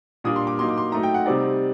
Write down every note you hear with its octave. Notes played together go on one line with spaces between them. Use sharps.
A#2 G3 A#3 D4 D#6
C6
D6
F#3 A#3 D#4 C6
D6
C6
F#3 A3 D#4 A#5
G5
F#5
C3 G3 C4 D#4 D5